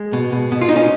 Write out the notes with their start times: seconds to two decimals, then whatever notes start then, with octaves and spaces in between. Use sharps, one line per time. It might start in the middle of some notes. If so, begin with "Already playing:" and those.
Already playing: G#3
0.13 B2
0.32 B2
0.52 B2
0.61 F4
0.69 B2 D#4
0.76 C#4